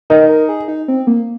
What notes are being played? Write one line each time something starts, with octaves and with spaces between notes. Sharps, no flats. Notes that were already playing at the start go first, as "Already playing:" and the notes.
D#4 A#4
A#4
G#4
D#4
C4
A#3